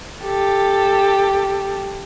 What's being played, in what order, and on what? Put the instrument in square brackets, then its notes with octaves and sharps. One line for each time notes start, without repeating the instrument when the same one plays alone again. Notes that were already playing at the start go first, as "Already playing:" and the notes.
[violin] G4 A4